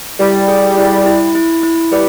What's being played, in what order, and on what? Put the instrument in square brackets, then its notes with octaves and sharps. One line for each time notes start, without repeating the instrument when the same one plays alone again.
[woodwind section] G3 [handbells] E4
[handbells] G#4
E4
E4
E4
E4
[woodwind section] G3 [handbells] B4